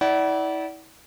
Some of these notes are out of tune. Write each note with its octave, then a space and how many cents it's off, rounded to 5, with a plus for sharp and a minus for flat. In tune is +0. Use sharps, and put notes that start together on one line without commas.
E4 -35 D5 -25 F#5 +25